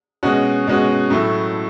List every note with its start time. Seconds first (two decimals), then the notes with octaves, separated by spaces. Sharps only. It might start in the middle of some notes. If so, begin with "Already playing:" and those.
0.23 B2 G#3 C#4 F#4
0.67 B2 G#3 C#4 F#4
1.10 A2 F#3 A3 E4